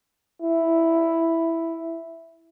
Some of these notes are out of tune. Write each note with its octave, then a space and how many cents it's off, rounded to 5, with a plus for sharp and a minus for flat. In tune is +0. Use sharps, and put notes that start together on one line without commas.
E4 +0